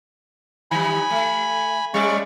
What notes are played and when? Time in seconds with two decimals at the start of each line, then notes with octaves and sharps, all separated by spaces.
0.71 D#3 G3 G#5 B5
1.10 A3
1.94 G3 G#3 C#4 D5 C#6